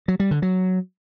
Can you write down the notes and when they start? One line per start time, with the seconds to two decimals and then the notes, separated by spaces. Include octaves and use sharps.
0.08 F#3
0.20 G3
0.31 D3
0.42 F#3